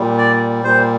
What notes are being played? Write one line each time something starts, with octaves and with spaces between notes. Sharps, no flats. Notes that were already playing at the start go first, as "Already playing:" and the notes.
Already playing: A#2 G3
D5
A#2 G3 C5